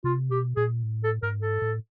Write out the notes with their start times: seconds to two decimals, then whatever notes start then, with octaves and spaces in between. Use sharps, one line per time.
0.04 C3 F4
0.30 B2 G4
0.56 A#2 G#4
0.83 A2
1.04 A4
1.23 G#2 A#4
1.42 A4
1.62 A2